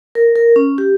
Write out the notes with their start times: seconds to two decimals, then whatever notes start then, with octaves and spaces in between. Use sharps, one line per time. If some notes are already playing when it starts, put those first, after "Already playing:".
0.15 A#4
0.36 A#4
0.56 C#4
0.78 G4